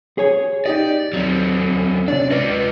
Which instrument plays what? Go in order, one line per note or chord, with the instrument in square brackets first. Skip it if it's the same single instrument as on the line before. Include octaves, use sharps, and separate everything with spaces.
[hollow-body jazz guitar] G#4 C#5 G#5
[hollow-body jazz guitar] D#4 G4 D#5 [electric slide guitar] D5
[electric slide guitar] F#3 C4
[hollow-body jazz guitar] C3 C#4 D4 [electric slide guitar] D5
[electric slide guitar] G#3 F4 D#5 [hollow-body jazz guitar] B4